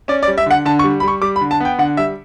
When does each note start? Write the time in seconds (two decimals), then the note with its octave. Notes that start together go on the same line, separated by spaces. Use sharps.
0.08 C#4 D5
0.23 D5
0.27 G3
0.38 E5
0.46 D3 F#5
0.65 D3 A5
0.79 C#6
0.84 G3
1.00 B5
1.03 G3 C#6
1.21 G3 D6
1.36 B5
1.41 D3
1.51 A5
1.60 B3 G5
1.78 D3 F#5
1.97 G3 E5